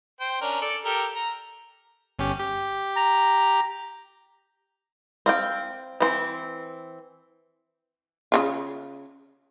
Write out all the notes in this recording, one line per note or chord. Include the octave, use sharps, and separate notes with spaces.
C5 G5
C#4 D4 A#4
A4 D5
G4 A4 A#4
A#5
G1 C#4 G4
G4
A#5
C4 F5 G5
E3 C4
C#3 E3 F4